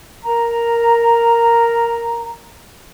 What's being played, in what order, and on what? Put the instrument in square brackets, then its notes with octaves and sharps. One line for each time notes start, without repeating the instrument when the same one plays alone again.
[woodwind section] A#4 A#5